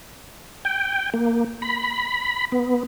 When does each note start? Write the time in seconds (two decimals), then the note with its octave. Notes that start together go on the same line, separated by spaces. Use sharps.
0.65 G5
1.14 A#3
1.62 B5
2.52 B3